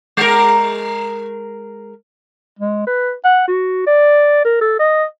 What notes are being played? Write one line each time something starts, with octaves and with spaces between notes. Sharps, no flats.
G#3 A#4
G#3
B4
F#5
F#4
D5
A#4
A4
D#5